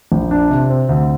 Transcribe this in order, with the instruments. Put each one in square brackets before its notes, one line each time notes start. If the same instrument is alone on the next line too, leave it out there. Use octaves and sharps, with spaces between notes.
[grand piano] A#1
D4
C3
C4
D2